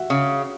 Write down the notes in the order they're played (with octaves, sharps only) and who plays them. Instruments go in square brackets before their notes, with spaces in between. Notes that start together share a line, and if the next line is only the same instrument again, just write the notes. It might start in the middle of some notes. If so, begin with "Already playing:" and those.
Already playing: [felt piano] F#4 E5 F#5
[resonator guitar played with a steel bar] C#3